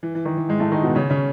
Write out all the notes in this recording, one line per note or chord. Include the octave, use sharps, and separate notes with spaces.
E3
E3
D#3
E3
G#2 G#3
A2 A3
D#3 D#4
B2 B3
C#3 C#4
C#3 C#4